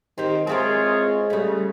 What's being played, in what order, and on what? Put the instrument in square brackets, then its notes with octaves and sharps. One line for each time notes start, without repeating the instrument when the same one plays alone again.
[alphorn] D#3 [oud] C4 G4
[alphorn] G#3 [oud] C4 E4 A#4 [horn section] F4 G#4 C#5
[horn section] C#3 [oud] G3 A3